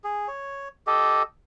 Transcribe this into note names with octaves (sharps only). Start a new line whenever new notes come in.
G#4
C#5
G4 A4 D#5